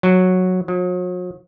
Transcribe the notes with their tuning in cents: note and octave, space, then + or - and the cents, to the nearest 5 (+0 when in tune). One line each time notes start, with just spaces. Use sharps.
F#3 -10
F#3 -45